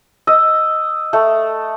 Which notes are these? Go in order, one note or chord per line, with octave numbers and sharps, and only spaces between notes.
D#5 E6
A3